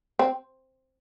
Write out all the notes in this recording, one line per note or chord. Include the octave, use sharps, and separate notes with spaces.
C4